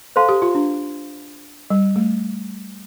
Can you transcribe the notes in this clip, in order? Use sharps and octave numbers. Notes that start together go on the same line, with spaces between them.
A4 C5 F5 A5 C6
G4
F4
D4
G3
A3